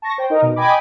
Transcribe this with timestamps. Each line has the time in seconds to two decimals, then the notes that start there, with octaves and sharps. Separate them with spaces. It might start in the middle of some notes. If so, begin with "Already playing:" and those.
0.02 A5 C#6 A#6
0.18 C5 G5
0.30 D#4 A#4 D#5
0.42 B2
0.56 D#5 G5 G#5 B5 D6